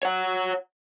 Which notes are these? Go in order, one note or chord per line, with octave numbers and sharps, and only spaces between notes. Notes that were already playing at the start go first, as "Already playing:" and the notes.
C#5 F#5